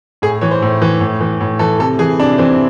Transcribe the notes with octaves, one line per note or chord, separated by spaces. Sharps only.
A2 G#4
E3 C#5
C5
A2
E3
A2
E3
A2
E3 A4
C3 A4
E3 G#4
C3 D4
E3 C4